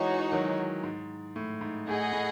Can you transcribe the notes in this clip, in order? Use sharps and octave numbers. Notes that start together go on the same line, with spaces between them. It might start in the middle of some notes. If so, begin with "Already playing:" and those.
Already playing: E3 G#3 D#4 F#4 C#5
D#3 F#3
G#2
A2
G#2
A2 G#4 D#5 F#5
A2